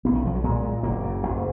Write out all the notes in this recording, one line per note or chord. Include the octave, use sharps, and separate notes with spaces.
B1 B3
D#3
B1 F3
F#3
A#2 G#3
A#2
F#1 A#3
C#3
F#1